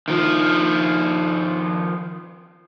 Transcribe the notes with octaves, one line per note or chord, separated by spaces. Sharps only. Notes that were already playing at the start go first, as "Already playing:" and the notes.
D#3 F3